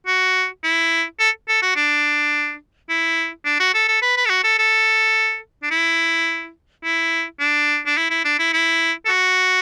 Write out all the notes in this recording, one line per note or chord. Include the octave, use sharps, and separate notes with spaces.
F#4
E4
A4
A4
F#4
D4
E4
D4
F#4
A4
A4
B4
B4
A4
F#4
A4
A4
D4
E4
E4
D4
D4
E4
E4
D4
E4
E4
A4
F#4